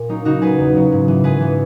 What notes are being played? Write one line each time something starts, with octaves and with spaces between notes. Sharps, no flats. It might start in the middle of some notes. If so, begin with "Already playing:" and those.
Already playing: A#2
F#3 A#3 C#4 D#4
C#3 D#4 F#4
F#3 B3 G#4 B4
E2
C#3 F#3
G#2
E3 B3
G#2 G#4 B4
E3 B3